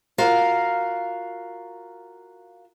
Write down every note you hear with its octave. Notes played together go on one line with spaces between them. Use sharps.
F4 F#4 A#4 F5